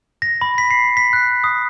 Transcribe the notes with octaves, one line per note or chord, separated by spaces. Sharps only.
A#6
B5
B6
C7
B6
F#6
D#6